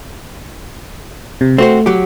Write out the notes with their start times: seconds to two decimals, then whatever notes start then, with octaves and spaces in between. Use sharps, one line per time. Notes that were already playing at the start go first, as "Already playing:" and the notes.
1.41 C3
1.58 A3 C4 F#4 C5
1.86 F#3 G4